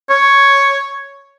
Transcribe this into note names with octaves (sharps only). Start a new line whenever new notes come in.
C#5